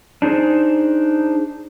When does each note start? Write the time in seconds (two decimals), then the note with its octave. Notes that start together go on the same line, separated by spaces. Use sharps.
0.22 D4 D#4 G#4 C5